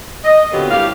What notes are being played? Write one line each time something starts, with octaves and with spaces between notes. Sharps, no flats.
D#5
A#2 D3 F#3 B3 C4 G4
A2 G3 F4 G4 F5